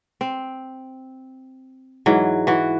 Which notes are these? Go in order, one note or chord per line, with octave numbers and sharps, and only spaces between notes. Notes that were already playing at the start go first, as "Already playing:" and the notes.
C4
G#2 E3 F#3
E3 F#4